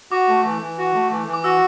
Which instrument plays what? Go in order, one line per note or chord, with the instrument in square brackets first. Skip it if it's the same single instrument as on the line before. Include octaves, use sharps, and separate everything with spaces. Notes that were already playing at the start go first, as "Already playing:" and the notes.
[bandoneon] F#4 [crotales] D6
[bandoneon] A3
E3
E3
F#4
A3
E3
E3
[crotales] D6
[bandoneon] F#4 [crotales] E6